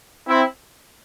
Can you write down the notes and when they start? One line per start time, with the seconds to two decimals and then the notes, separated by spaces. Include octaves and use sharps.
0.27 C4 E4